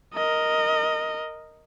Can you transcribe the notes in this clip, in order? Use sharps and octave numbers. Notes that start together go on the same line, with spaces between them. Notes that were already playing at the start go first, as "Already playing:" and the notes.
A#4 D#5